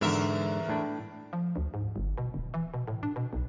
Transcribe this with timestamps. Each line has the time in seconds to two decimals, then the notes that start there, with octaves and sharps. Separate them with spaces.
0.01 E2 G#2 D3 A#4 E5
0.69 A2 D4
1.33 F3
1.56 D2
1.74 G#2
1.96 G1
2.18 B2
2.34 D1
2.54 E3
2.74 B2
2.88 A2
3.03 D4
3.16 B2
3.33 B1